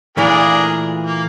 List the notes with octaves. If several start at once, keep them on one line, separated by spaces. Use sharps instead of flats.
A#2 E3 A3 D4 G#4 A#4
A#3